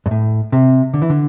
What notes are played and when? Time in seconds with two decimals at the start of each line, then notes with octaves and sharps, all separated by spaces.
0.06 G2
0.11 A2
0.52 C3
0.94 D3
1.02 E3
1.10 D3